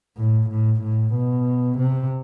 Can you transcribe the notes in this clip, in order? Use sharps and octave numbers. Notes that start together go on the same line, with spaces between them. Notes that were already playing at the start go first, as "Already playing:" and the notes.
A2
A2
A2
B2
C3